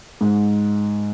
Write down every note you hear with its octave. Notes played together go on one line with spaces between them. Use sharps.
G#2